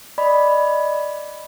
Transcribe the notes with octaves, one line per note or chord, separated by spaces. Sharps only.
D5 D#5 B5